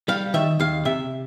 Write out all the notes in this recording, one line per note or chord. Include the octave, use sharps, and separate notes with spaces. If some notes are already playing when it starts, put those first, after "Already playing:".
G3 F5
D#3 E5
D#2 F5
C3 E5